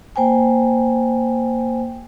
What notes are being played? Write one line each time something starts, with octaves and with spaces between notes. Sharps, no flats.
A#3 C5 G5 G#5